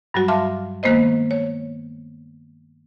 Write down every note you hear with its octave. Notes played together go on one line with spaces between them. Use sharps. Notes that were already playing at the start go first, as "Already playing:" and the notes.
G2 F#3 G3 F#4
E5 F5 A5 C6 D6 F6
D#3 G#3 A#3 B3 C5 D#5
C#5